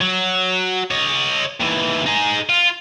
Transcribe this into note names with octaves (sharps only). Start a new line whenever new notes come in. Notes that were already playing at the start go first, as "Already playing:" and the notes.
F#3
C#5 D#5
D#2 E3
D#4 G#4
F4